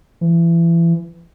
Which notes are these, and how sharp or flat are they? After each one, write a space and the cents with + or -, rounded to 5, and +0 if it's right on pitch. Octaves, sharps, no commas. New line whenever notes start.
E3 +30